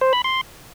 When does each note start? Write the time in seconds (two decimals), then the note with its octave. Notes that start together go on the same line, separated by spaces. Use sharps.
0.01 C5
0.13 B5
0.24 C6